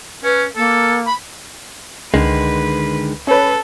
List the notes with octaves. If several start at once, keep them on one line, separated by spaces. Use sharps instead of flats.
C#4 B4
A#3 A4
B5
C#2 D3 D#3 G#3 B4
C#4 A4 B4